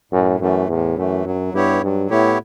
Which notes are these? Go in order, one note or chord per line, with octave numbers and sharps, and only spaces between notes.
F#2 A2
F#2 E3 A3
E2 A2
F#2 E3 A3
F#2 F#3
G2 B3 E4 G4 C#5
G2 F#3
A2 B3 E4 G4 C#5